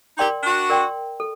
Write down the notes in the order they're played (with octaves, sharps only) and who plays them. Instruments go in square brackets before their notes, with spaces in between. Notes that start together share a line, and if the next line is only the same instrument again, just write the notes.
[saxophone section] D#4 G4 [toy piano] A#4 D5 G5 C6
[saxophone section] D4 F#4
[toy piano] A#4 D5 G5 C6
A4